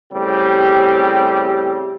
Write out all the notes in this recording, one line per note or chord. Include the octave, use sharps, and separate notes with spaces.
A2 C#3 G3 C4 G4